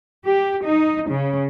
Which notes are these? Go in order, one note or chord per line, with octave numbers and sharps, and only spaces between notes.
G4
D#4
C#3